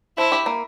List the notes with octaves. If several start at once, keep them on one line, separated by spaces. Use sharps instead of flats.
F3 E4
G4
A#3